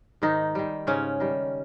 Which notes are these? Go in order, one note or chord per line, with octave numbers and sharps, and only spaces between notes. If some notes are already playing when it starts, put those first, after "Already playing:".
G#2 D#3 D#4
D#3 G3
G#2 C#3 C#4
D#3 G3